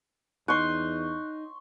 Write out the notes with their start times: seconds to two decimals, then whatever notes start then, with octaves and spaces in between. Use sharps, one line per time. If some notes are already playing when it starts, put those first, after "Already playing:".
0.48 E2 D#4 C6 C#6 F#6